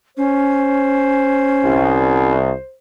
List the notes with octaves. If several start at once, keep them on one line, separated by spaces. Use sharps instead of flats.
C#4 C5
C2